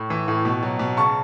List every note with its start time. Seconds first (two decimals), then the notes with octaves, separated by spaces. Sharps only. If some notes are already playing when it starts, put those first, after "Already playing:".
Already playing: A2
0.10 E3
0.28 A2
0.45 B2
0.63 F#3
0.79 B2
0.97 C#3 A5 C#6